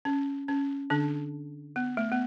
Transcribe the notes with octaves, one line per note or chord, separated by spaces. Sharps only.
C#4
C#4
D3 D4
B3
A3
B3